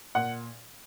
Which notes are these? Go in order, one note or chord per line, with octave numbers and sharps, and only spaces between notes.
A#2 F#5